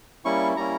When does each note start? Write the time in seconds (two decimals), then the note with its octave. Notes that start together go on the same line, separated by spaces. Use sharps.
0.25 G3 A#3 C#4 E4 C#6
0.57 G3 A#3 C#4 E4 A#5